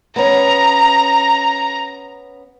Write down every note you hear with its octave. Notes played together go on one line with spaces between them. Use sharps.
B3 C#4 A#5